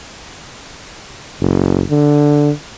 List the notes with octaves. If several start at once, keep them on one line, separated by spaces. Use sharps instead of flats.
F#1
D3